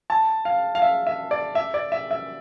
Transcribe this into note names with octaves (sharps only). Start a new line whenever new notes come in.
A5
F5
F5
E5
E5
D5
E5
D5
E5
E5